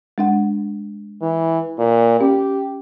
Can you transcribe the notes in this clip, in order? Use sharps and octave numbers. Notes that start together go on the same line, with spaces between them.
G#3 D4 F#5
E3
A#2
C#4 G4